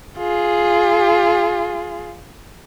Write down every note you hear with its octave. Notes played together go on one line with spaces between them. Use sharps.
F4 G#4